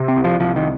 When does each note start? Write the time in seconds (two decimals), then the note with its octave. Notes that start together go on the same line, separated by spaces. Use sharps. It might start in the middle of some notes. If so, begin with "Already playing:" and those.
Already playing: C3
0.08 C4
0.17 C2
0.24 F3
0.40 C2 F3
0.56 D#3